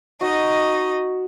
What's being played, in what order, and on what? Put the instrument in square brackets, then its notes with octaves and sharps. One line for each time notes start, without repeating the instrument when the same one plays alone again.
[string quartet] D#4 D#5 [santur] F#4